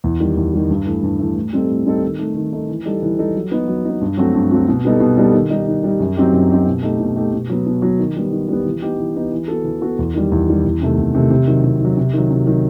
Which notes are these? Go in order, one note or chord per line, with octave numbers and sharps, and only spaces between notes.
E2
D#3 G3
E2
D#3 G3
G2
E3 A3
G2
E3 A3
A2
G3 C4 D#4 A4
A2
G3 C4 D#4 A4
D#3
A3 D#4
D#3
A3 D#4
E3
G3 D#4 A4
E3
G3 D#4 A4
F#3
B3 D#4
F#3
B3 D#4
G2
F#3 A3 C4 F#4
G2
F#3 A3 C4 F#4
B2
G3 B3 D#4 A4
B2
G3 B3 D#4 A4
D#3
G3 D#4
D#3
G3 D#4
F#2
F#3 C4 D#4 G4
F#2
F#3 C4 D#4 G4
B2
A3 D#4 G4
B2
A3 D#4 G4
B2
F#3 B3
B2
F#3 B3
D#3
G3 B3
D#3
G3 B3
E3
B3 D#4 G4
E3
B3 D#4 G4
E3
B3 F#4 A4
E3
B3 F#4 A4
E2
D#3 G3
E2
D#3 G3
E2
C3 D#3 A3
E2
C3 D#3 A3
C3
D#3 F#3
C3
D#3 F#3
C3
D#3 F#3
C3
D#3 F#3